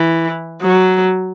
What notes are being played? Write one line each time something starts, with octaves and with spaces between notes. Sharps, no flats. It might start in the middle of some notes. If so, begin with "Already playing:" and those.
Already playing: E3
F#3